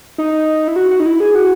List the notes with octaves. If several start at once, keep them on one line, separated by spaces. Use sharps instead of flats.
D#4
E4
F#4
F#4
D#4
E4
G#4
F#4